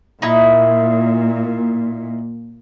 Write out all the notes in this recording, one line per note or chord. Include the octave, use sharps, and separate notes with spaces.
A#2 D#4 E4